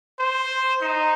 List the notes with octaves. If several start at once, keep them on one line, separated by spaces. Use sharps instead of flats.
C5
D#4